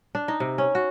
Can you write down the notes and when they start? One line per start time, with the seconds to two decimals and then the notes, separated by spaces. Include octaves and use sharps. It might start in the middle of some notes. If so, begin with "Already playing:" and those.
0.15 D4
0.28 D#4
0.40 C3
0.58 C#4
0.75 F#4